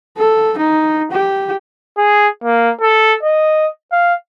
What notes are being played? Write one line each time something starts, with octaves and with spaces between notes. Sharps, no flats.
A4
D#4
G4
G#4
A#3
A4
D#5
F5